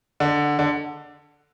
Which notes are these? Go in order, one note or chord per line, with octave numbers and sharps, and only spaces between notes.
D3
D3